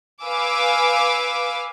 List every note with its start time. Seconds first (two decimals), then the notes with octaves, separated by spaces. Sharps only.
0.23 B4 F5 G#5 D6 E6